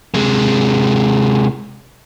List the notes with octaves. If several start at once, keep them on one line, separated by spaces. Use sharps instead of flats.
C3 G#3